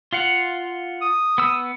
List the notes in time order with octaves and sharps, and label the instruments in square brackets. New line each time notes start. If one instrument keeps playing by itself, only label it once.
[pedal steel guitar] F4 F5 F#5
[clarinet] D#6
[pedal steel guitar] B3 E6